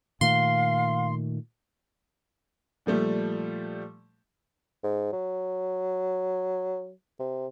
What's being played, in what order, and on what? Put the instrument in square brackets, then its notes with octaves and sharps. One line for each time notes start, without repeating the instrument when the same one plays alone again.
[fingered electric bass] A#2 D#3 A3 [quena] F5 [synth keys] C6
[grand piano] A#2 F3 G3 A3
[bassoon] G#2
F#3
C3